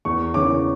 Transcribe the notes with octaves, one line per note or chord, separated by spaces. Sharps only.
E2 C#6
C#3 E3 D6